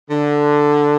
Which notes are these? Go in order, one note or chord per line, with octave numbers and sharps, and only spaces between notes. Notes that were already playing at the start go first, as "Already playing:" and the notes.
D3